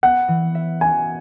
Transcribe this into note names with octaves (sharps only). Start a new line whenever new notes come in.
B3 F#5
E3
E5
F#4 G#5